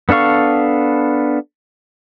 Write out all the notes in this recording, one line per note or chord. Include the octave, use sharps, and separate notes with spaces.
B3 D4 A4 F5 C#6